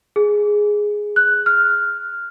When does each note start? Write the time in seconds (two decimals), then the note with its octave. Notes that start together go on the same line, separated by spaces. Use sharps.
0.16 G#4
1.16 F#6
1.46 F6